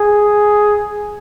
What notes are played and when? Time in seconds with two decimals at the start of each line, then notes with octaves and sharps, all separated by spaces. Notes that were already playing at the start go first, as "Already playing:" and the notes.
Already playing: G#4